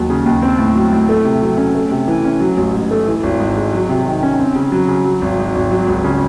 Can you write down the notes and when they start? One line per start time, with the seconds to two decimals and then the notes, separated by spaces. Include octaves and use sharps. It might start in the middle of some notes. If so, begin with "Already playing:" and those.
Already playing: D#2 F#3
0.10 C#3
0.26 D#2
0.42 C4
0.59 A2
0.75 F#3
0.93 A2
1.09 A3
1.25 C3
1.42 F#3
1.58 C#4
1.75 A3
1.91 C3
2.08 E3
2.24 C#4
2.40 F#3
2.57 A1
2.74 G#2
2.91 A3
3.07 E3
3.23 G#1
3.40 G#2
3.56 G#3
3.73 F#3
3.89 C3
4.06 D#3
4.23 C#4
4.39 C4
4.56 C#3
4.72 F#3
4.88 C#3
5.05 F#3
5.22 G#1
5.38 G#2
5.55 G#1
5.71 F#3
5.87 C#2
6.04 C#3